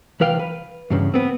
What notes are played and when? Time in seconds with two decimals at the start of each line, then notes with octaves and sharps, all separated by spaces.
0.20 C2 E3 B4 F5 G5
0.39 B4
0.90 E2 G2 C#3
1.14 B3 C4